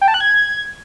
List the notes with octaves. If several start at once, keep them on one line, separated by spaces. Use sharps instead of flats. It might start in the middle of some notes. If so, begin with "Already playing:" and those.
G5
A5
F#6
G#6